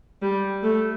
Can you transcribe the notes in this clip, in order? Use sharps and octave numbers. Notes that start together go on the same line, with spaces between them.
G3
A3